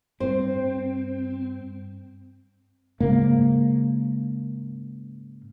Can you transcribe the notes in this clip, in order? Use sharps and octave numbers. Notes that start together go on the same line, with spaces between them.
G2 C4 C5
G#2 C#3 A#3